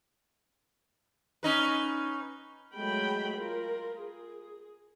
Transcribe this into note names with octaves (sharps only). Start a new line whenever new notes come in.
C#4 D#4 B4
F#3 G#3 A3 G5 B5
F4 A#4
G#4